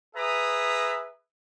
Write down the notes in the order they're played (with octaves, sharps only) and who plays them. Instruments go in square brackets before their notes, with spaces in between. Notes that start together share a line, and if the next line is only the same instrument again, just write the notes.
[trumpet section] G#4 B4 E5 A#5 D#6